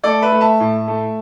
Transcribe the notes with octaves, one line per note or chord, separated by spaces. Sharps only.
A3 A4 D5
B4 E5
A3
E5 A5
A2
A3